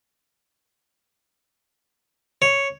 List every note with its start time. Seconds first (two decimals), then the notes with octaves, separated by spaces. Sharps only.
2.42 C#5